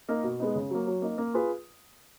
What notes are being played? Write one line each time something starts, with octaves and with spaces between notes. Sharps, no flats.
A#3 D#4 A#4
B2
G#3 B3 D#4
C#3
F#3 A#3
F#3
A#3 D#4
A#3
F4 G#4 B4